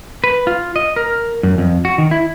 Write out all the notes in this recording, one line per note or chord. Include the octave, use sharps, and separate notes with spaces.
B4
F4
D#5
A#4
F#2
F2
F#4
D#3
E4